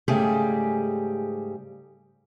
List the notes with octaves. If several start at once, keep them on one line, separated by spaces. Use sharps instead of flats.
G#2 C#3 G3 A3 G4 G#4